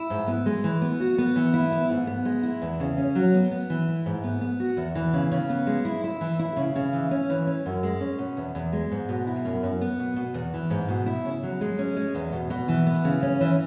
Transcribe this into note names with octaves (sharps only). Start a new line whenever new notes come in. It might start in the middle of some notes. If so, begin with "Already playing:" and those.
Already playing: E4
G#2
B3
G#3
E3
B3
F#4
B3
E3
E4
B3
G#2
B3
G#3
E4
E2
C#3
C#4
F#3
B3
B3
E3
E4
G#2
B3
B3
F#4
E2
E3
C#3
C#3
B3
G#3
E4
E4
E3
E4
C#3
C#3
E3
C#4
E3
C#4
F#2
G#3
C#4
B2
E2
E2
G#3
G#2
B2
E4
F#2
F#2
B3
B2
B2
E2
E3
G#2
B2
E4
C#3
F#3
G#3
C#4
G#3
E2
B2
B2
E3
B3
C#3
C#4
E3